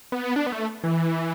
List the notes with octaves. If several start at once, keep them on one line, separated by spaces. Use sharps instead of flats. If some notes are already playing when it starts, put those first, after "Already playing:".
B3
D4
B3
A3
E3